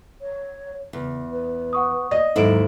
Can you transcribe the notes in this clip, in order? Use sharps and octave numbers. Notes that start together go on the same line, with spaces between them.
C#5
E2 C#3
B4
F#5 C#6 D#6
D5 D#5
D#2 G#2 F#3 E4 A4 D7